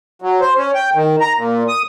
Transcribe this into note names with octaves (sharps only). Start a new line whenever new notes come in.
F#3
C5
C#4
G5
D#3
A#5
A#2
D#6